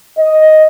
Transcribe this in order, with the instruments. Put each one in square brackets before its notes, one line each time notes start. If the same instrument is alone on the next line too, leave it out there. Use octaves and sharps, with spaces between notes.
[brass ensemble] D#5